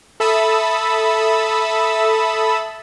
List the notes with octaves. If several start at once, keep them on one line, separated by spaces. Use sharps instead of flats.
A4 E5 A5 B5 D#6 E6